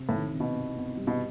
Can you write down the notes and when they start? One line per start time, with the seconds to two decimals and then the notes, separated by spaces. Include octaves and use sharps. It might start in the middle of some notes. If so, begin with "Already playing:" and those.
Already playing: C3
0.09 A2 D#3
0.34 C3
0.40 B2
0.56 B3
0.77 B3
0.97 G3
1.07 B2